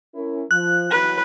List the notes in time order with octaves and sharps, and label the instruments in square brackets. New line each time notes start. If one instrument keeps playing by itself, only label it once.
[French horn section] C#4 E4 A#4
[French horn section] F3 [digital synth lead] F#6
[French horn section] E3 F#3 [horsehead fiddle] B4